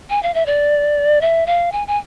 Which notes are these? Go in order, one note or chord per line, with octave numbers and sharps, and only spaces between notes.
G#5
F5
E5
D5
E5
F5
G#5
G#5